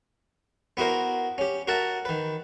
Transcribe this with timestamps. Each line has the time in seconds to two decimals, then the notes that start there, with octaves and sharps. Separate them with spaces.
0.77 B3 E4 F#4 A#4 C5
1.38 C#4 G4
1.68 F#4 A#4 E5 F#5 A5
2.05 D#3 B4